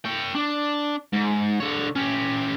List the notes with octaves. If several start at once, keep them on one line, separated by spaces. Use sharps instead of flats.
C#5 G5
D4
G#2
D3 C#5
C#4 G4